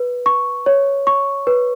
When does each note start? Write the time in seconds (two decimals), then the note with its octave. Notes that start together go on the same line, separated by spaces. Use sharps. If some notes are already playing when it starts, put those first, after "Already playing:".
Already playing: B4
0.26 C#6
0.66 C#5
1.07 C#6
1.47 B4